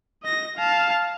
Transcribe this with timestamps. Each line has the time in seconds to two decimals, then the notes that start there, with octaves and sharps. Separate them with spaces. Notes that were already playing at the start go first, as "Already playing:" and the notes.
0.23 D#5 A#6
0.57 F5 A5